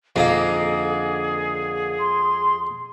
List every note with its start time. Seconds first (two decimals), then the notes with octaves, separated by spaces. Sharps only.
0.16 F2 D3 A#3 D#4 G#4 F5
2.00 C6